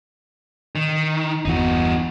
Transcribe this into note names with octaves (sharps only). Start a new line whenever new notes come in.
D#3
G1 E2 D#4 F#4